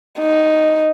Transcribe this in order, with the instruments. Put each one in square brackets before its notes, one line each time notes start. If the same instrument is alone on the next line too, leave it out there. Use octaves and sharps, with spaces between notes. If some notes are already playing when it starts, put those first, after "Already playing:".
[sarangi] D#4